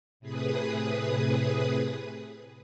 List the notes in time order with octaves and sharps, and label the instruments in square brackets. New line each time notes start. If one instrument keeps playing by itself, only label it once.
[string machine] A2 C3 G#4 B4 D#6